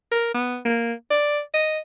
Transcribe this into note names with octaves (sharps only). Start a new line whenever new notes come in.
A#4
B3
A#3
D5
D#5